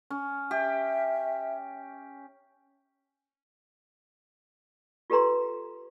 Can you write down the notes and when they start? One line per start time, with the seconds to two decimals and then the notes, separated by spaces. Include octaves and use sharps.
0.10 C#4
0.51 G4 E5
5.10 F4 G4 A4 B4 A#5 C6